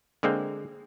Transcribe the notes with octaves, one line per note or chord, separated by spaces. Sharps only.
D3 G#3 A#3 C4